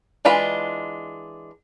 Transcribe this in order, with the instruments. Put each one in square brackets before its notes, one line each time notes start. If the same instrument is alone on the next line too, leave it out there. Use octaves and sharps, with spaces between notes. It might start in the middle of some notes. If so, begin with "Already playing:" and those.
[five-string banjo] E3 G#3 D4 F4 B5